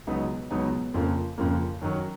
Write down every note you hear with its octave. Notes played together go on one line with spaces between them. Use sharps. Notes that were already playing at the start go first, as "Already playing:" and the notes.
C#2 B2 F#3 B3 D#4
C#2 B2 F#3 B3 D#4
F2 C#3 F3 A#3
F2 C#3 F3 A#3
F#2 D#3 F#3 C#4